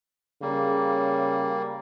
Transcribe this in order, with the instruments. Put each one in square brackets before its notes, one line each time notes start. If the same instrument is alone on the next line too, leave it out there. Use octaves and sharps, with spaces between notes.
[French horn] C#3 [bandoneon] G3 A#3